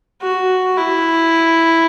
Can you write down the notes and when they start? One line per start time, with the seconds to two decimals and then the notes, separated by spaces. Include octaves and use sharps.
0.22 F#4
0.77 E4